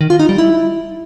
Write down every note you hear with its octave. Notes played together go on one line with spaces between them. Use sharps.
D#3
F4
D#4
G3
E4